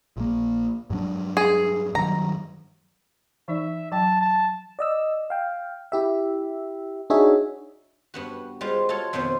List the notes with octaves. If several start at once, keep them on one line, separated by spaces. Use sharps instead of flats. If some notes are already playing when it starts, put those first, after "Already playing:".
A#1 A#3
G2 F#3 D4
G#4
G2 D#3 F#3 A#5
E3 D#4 D5 E5
F#3 G5 A5
A5
D5 D#5 E6
F5 G5
E4 G4 E5
D4 D#4 F#4 G#4 C#5 E5
G2 B3 F#4
G3 G#3 F4 C5
F4 F#4 A4 C#5
F2 B2 D#3 B3 C5